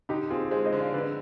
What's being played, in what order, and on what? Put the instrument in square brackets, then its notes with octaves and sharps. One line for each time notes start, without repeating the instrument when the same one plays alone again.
[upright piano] D3 [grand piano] D#4 G4
[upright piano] C4 [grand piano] F4 G#4
[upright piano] G#3 [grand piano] G#4 C5
[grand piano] C5 D#5
[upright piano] D3
[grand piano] D5 F5
[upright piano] D3 [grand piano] B4 D5